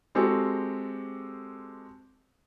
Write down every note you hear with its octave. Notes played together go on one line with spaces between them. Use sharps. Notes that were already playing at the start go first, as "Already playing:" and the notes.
G#3 C4 F#4 G4 A4